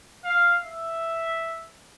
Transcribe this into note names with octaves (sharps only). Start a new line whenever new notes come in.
F5
E5